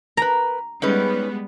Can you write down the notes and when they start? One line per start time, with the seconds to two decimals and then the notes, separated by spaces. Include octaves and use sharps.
0.17 A#4 B4 A#5
0.82 G3 G#3 B3 C#4 D#4 B4